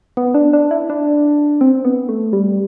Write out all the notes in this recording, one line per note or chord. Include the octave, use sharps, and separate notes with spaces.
B3
D4
D4
E4
D4
C4
B3
A3
G3